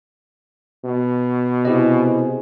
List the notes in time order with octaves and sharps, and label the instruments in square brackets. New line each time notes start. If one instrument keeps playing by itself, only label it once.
[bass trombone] B2
[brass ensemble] C3 G#4 C5 [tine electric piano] E4 G4 D#5